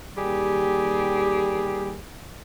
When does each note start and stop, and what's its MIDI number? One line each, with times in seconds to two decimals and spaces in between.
0.17 1.96 39
0.17 1.96 55
0.17 1.96 67
0.17 1.96 68